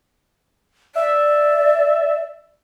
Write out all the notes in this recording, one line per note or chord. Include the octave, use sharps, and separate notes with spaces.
D5 E5